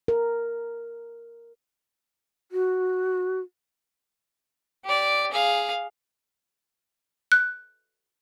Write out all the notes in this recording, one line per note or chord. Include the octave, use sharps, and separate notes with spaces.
A#4
F#4
G4 D5
G#4 F5
F#6